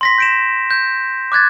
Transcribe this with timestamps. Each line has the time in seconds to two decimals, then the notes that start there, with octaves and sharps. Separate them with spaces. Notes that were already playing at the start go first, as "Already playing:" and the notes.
0.01 C6 A#6 B6
0.18 G6 D7 E7
0.71 G6
1.32 D6 F#6 G#6 A6